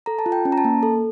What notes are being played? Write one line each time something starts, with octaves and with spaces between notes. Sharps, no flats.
A4 A#5
A5
F4
G5
C#4
A#5
A5
A#3
A4